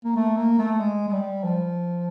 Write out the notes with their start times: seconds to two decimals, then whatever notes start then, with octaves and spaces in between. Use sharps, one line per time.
0.05 A#3
0.16 A3
0.37 A#3
0.59 A3
0.80 G#3
1.08 G#3
1.13 G3
1.44 F3